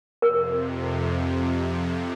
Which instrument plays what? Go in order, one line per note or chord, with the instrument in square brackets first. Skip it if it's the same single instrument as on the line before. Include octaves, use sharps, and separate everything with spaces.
[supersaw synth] F2 C3 [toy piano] A#4